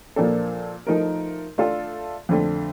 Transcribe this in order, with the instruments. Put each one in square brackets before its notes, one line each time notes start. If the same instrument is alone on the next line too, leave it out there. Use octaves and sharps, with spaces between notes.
[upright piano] A#2 F3 A#3 D4 A4
F3 A3 D#4 A#4
A3 D4 F4 A4
F2 D3 A3